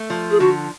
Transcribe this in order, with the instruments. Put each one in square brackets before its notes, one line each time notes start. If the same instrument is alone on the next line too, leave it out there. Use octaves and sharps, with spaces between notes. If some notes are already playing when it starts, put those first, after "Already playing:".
Already playing: [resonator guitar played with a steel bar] A3
F3
[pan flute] G#4
[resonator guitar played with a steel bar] D3 [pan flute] F#4